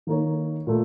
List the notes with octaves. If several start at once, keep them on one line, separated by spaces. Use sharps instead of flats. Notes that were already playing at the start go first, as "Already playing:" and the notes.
D#3 A#3 D#4 A#4 C#5
A#2 A3